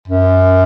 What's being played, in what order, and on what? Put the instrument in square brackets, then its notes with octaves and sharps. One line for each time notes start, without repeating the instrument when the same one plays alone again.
[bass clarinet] F#2